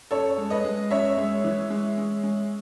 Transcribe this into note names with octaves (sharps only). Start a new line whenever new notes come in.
F#2 A4 C#5
G#3
B4 D#5
G#3
F#2 C#5 E5
G#3
E3
G#3
G#3
G#3